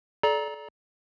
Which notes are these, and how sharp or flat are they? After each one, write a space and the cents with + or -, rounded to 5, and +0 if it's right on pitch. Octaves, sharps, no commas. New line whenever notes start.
A4 -35 D5 -10 A#5 +15